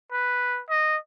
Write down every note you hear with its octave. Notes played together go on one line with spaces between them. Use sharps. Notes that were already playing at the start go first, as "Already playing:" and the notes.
B4
D#5